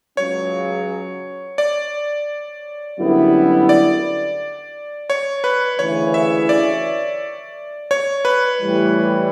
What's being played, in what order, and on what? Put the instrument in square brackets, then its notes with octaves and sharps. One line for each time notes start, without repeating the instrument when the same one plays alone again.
[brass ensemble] C#2 C#3 F#3 C#4 [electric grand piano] C#5
[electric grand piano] D5
[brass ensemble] F#2 D3 G3 B3 E4
[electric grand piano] D5
C#5
B4
[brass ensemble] D2 C#3 E3 [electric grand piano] C#5
[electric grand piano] E5
D5
C#5
B4
[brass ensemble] A2 E3 G3